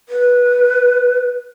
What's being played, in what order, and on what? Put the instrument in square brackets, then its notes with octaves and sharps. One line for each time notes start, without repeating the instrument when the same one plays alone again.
[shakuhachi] B4